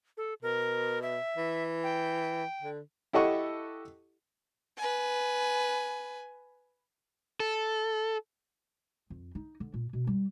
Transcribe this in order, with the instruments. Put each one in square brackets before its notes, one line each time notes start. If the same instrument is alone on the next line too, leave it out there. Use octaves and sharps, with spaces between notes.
[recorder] A4
[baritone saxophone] B2 [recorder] A#4
[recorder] E5
[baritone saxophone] E3
[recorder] G5
[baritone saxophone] D3
[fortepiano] E4 G4 A4 D#5 F#5 C#6
[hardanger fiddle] B4 G#5
[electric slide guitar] A4
[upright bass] F2
D#4
D3
A#2
B2
G3